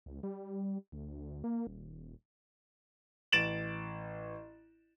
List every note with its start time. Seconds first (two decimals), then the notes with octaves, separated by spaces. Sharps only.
0.06 C#2
0.23 G3
0.92 D2
1.44 A#3
1.67 D#1
3.32 A1 A6 D7 E7 F#7